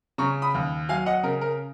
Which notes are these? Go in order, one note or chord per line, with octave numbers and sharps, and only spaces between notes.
C#3 A#5 C#6
B5 D#6
D#2
F#3 F5 G#5
D#5 F#5
C#3 A#4
A#4